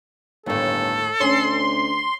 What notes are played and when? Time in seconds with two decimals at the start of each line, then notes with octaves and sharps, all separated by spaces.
0.46 G1 D#2 A2 A4
1.20 D2 C#4 C6